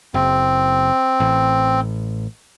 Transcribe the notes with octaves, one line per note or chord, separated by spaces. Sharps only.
F#1 C4
A1